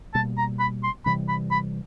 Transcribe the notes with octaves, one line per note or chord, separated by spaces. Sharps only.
B2 G3 A#3 A5
A#5
B5
C6
C3 E3 G3 B5
B5
B5